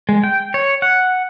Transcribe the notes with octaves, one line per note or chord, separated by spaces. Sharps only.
G#3
G5
C#5
F#5